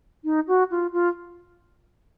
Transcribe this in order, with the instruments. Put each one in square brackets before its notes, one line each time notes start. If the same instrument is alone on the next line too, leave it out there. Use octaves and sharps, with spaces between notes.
[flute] D#4
F#4
F4
F4